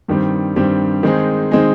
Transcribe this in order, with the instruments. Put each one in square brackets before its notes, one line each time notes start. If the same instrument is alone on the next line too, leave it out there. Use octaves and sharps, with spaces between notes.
[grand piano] G2 D#3 G3 C4
G2 D#3 G3 C4
D#3 G#3 C4 D#4 G#4
D#3 G#3 C4 D#4 G#4